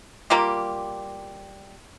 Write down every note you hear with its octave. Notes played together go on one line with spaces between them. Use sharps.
G3 A#3 F4 G4